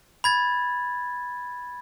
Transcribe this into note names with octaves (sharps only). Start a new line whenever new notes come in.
B5 G#6 A6